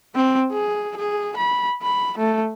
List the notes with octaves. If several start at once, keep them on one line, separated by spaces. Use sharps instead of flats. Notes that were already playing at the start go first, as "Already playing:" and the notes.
C4
G#4
G#4
B5
B5
A3